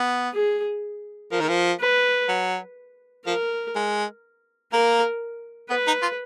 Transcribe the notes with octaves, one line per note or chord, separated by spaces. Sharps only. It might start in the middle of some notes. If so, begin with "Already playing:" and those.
Already playing: B3
G#4
F3 A#4
D#3
F3
B4
F#3
F3 A#4
G#3
A#3 A#4
B3 B4
D#4
F4